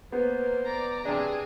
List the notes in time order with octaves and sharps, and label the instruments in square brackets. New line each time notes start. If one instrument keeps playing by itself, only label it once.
[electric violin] A#3 [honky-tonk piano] B3 [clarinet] C5
[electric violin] D5 A#5
[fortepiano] C3 D4 [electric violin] G#4